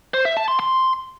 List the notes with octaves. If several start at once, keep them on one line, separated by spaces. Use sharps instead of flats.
C5
E5
A5
C6
C6